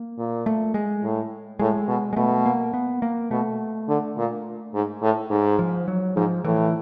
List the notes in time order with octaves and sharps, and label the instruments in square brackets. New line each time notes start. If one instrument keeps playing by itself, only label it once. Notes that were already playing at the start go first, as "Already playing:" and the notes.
Already playing: [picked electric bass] A#3
[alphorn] A#2
[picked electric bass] A3
G#3
[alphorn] A2
[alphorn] A2 [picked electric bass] G#3
[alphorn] B2
[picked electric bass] G#3
[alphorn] B2 [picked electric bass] A3
[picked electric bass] A#3
B3
A#3
[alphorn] B2 [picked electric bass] A3
[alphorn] D3
A#2
G#2
A2
G#2
[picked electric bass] F3
F#3
[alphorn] G#2 [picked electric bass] F3
[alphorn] A2 [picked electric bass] E3